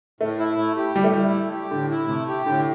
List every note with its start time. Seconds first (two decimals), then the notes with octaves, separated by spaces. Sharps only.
0.21 A2 A3
0.39 E4
0.58 A3
0.77 G4
0.96 A2 G3
1.04 A3
1.13 G3 E4
1.33 A3
1.52 G4
1.71 A2 D3
1.90 E4
2.08 C3 A3
2.28 G4
2.46 A2 D3